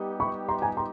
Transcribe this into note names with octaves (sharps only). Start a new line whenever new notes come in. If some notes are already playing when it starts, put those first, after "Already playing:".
Already playing: G3 B3 D#4 G4
B5 C#6
A#5 C6
G#5 A#5
A#5 C6